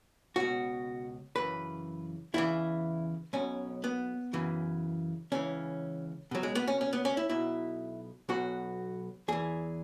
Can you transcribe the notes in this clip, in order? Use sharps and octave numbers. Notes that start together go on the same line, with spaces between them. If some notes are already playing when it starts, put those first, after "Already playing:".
C#2 B2 F#4
F#2 C#3 E3 B4
E2 C#3 E3 E4
B1 B2 C#4
B3
F#2 C#3 E3
C#2 C#3 E3 C#4
C#2 B2 F#3
G#3
B3
C#4
C#4
B3
C#4
E4
B1 B2 E4
B1 B2 F#4
E2 E3 G#4